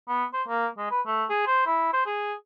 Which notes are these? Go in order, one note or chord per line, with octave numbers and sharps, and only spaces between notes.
B3
C5
A#3
G#3
B4
A3
G#4
C5
E4
C5
G#4